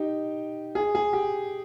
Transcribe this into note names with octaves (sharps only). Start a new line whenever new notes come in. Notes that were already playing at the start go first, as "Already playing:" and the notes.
Already playing: D#4 G4
G#4
G#4
G4